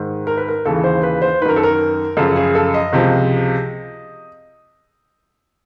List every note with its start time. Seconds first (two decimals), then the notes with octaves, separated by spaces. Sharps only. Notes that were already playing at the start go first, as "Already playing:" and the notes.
Already playing: G#2 D#3
0.27 A#4
0.37 B4
0.48 A#4
0.65 D#2 C#3 E3 A4
0.84 C5
1.03 B4
1.22 C5
1.41 D#3 B4
1.45 F#2 A#4
1.56 A4
1.63 A#4
2.17 F#2 C#3 F3 A4
2.36 G#4
2.55 A4
2.74 D#5
2.93 C#2 C3 F3